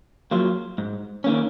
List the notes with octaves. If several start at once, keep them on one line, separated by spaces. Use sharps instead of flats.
F#3 A#3 F4
G#2
D#3 A#3 C#4